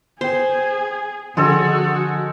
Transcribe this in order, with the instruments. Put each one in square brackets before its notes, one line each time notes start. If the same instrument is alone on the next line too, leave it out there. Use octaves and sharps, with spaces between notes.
[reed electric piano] B3 G5 [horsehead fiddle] G#4 [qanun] C5
[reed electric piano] D3 F3 [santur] G#3 C4 A4 [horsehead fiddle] F#4